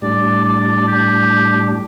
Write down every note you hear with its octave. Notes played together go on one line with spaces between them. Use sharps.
A2 G3 D4 D5
D5
G4